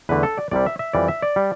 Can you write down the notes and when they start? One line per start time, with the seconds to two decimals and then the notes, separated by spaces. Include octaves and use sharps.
0.09 E2 D3 A3 B4
0.23 A4
0.37 D5
0.51 C2 C3 G3 D5
0.66 E5
0.79 E5
0.93 F2 E3 G3 D5
1.08 E5
1.22 D5
1.36 G3